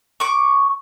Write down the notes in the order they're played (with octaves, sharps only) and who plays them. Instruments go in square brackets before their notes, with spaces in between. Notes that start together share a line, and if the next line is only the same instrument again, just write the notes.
[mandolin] C#6 D6